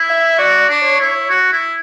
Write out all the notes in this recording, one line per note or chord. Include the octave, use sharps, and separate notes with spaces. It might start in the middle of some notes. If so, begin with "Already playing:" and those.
Already playing: E4
E5
F#4 D5
D4
C#5
E4
F#4
E4